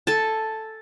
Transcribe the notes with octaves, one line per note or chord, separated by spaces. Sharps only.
A4 G#5 A5